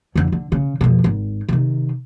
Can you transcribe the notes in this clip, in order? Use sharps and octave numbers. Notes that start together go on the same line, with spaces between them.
F2 D3
D3
C#3
F2 B2
G#1
C3 D#3